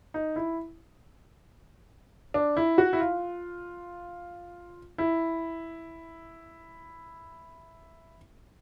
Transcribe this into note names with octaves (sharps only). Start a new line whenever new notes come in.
D#4
E4
D4
E4
F#4
E4
F4
E4